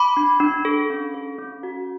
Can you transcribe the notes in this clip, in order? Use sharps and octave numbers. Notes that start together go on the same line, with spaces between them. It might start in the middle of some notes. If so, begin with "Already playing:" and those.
Already playing: B5 D6
D4
D4
A4
C#4
A4
C#4
F#4